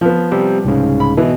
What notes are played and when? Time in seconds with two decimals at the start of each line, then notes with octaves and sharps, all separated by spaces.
0.01 F3 B3
0.32 G3 C4 G4
0.65 C2 G#2 C#3
1.00 B5
1.17 B2 E3